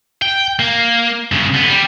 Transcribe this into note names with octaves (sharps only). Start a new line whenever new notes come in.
G5
A#3
G2 C#3
D3 B3
G3